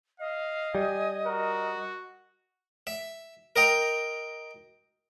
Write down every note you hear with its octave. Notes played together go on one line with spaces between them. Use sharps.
D#5 F5
G3 G#5
F#4 A#4
E5
A#4 D#5 G5 A#5